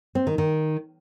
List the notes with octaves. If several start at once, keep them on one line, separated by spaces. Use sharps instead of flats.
C4
D#3
D#3